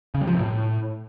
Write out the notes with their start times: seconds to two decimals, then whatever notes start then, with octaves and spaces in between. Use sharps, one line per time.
0.15 C#3
0.21 G3
0.27 F3
0.34 C3
0.40 A2